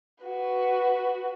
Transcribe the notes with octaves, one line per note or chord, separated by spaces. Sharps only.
F#4 B4